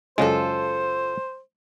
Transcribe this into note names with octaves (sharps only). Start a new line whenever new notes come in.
F#2 C#3 G#3 F4 A4 C5